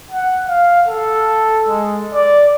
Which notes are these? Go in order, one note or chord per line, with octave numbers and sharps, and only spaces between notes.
F#5
F5
A4
G#3
D5